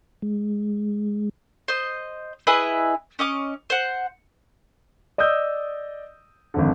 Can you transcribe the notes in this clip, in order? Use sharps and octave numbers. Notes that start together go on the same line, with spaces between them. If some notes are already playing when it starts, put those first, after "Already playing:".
G#3
C5 D#5
E4 G#4 B4 D#5
C#4 D#5 D6
C5 F#5
D5 D#5 D#6 E6 G6
G#1 F2 D3